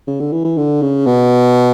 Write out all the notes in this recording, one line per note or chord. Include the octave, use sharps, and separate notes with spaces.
C#3
D3
E3
E3
D3
C#3
B2